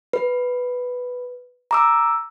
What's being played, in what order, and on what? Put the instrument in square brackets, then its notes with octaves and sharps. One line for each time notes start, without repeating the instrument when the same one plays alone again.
[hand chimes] B4
A#5 D6 E6